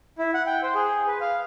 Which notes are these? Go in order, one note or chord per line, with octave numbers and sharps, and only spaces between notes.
E4
F#5
G5
C5
G#4
B4
F5